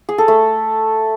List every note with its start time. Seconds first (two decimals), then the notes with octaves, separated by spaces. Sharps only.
0.09 G#4
0.18 A4
0.28 A3